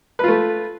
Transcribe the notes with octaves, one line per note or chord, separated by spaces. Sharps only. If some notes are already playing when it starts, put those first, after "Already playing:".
A3 F4 B4